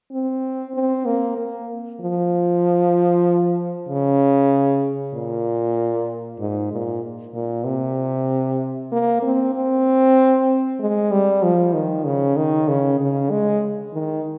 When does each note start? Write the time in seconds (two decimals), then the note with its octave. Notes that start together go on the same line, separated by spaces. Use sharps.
0.12 C4
0.74 C4
1.05 A#3
1.38 A#3
2.01 F3
3.89 C#3
5.14 A#2
6.40 G#2
6.72 A#2
7.34 A#2
7.66 C3
8.92 A#3
9.23 C4
9.54 C4
10.80 G#3
11.11 G3
11.43 F3
11.74 D#3
12.05 C#3
12.37 D#3
12.68 C#3
13.00 C#3
13.31 G#3
13.93 D#3